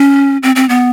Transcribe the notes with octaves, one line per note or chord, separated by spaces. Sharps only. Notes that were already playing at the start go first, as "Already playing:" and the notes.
Already playing: C#4
C4
C4
B3